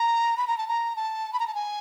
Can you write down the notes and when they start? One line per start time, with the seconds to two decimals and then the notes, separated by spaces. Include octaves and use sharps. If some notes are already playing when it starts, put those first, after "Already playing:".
Already playing: A#5
0.37 B5
0.47 A#5
0.58 A5
0.68 A#5
0.96 A5
1.33 B5
1.40 A#5
1.47 A5
1.55 G#5